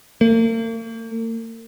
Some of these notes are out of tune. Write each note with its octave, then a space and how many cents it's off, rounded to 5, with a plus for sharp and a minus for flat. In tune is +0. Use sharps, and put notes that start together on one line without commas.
A#3 -45